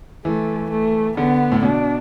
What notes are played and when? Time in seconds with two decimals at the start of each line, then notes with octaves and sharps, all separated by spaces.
0.25 E3 A3
0.71 A3
1.17 D3 B3
1.52 A2
1.63 B2 D4